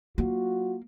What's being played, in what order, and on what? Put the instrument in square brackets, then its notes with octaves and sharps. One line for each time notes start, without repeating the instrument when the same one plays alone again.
[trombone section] F#3 F4 F#4 [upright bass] A#3